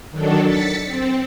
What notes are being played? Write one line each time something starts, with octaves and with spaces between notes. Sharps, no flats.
D#3 F#3 D4 A4
A6 B6 C#7
C4